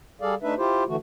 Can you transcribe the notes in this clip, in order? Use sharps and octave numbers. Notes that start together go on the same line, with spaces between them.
G3 G#4 A4 D5 F5
A3 D4 D#4 B4 E5
E4 F4 G4 C5
D3 E3 A3 F#4